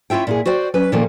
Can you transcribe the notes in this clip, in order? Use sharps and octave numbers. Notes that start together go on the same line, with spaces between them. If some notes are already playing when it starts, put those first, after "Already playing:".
C#4 E4 F4 E5 G5
A#2 E4 G#4
F#4 C5 D5 G5
F#3 C#4 B4
A#2 D#3 F3 A3 A#3